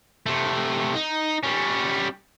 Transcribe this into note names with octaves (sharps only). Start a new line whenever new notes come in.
C3 A3
D#4
G3 C#4